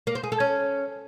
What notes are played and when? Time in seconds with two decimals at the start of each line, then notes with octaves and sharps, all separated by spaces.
0.07 A#3
0.15 C5
0.24 G#4
0.32 A4
0.40 C#4